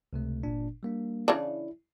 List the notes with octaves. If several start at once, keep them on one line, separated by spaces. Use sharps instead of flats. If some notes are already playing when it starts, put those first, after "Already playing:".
C#2 C3 A3
G1 A#2 D4
G3 A#3 D4
C#3 E3 D4 E4